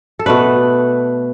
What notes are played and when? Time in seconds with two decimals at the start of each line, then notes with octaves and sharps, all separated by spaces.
0.19 A4
0.26 B2 A3 D4 B4